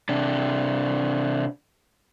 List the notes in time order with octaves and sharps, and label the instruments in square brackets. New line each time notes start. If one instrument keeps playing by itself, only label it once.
[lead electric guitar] C3 D4